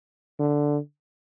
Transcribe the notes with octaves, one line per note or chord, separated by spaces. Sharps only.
D3